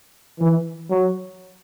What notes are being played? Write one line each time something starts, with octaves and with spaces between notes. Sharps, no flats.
E3
F#3